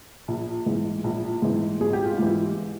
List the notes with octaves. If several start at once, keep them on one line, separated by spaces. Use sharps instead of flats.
A#1
G#2 E3
A#1
G#2 E3
G#1 G#4
G4
F4
G#2 E3 G4